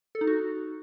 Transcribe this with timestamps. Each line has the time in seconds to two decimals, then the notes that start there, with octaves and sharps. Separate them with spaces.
0.15 A4
0.21 D#4
0.27 F#4